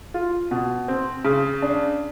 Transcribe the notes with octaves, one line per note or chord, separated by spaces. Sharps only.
F4
B2
C4
C#3
D4